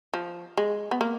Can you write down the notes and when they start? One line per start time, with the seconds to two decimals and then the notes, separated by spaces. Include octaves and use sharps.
0.14 F3
0.57 G#3
0.91 B3
1.01 A#3